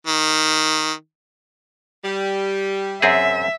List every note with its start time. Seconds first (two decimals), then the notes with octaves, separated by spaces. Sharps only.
0.07 D#3
2.04 G3
3.02 F#2 C4 G#4 E5